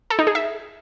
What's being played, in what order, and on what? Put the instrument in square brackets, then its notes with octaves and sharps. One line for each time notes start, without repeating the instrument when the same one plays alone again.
[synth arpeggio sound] A4
D#4
G#4
E5